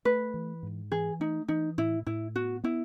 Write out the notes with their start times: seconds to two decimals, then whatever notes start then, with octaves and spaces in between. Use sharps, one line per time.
0.05 A3 B4
0.34 E3
0.63 G#2
0.91 E3 G#4
1.20 A3 D#4
1.48 E3 D#4
1.78 A2 E4
2.06 A2 E4
2.36 B3 F#4
2.64 B3 E4